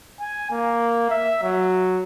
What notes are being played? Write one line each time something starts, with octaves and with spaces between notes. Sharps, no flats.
G#5
A#3
E5
F#3